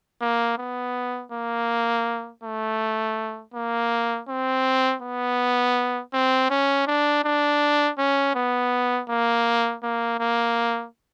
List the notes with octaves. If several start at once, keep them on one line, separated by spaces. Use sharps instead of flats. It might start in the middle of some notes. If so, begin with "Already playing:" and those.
A#3
B3
A#3
A3
A#3
C4
B3
C4
C#4
D4
D4
C#4
B3
A#3
A#3
A#3